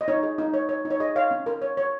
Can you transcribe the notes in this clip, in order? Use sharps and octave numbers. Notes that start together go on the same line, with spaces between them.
D#5
D#4 C#5
G#4
D#4
C#5
C#5
D#4
C#5
G#4 D#5
C#5 F5
C#4
A#4
C#5
C#5